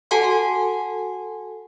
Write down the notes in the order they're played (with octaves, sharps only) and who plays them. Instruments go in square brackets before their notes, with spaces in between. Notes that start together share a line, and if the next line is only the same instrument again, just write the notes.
[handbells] F#4 A4 F#5 G#5 A5 C6